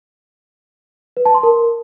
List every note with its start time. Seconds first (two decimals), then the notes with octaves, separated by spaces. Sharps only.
1.17 B4
1.25 A5
1.34 C6
1.43 A#4